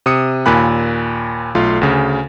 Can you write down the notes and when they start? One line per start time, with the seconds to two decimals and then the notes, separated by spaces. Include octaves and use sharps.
0.06 C3 D#6 C#7
0.46 D#2 A#2 G#5 B5 F#6
1.55 B1 A3 F4 F5
1.81 D2 C#3